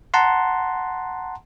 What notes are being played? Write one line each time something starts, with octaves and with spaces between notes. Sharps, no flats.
F#5 A5 A#5 C6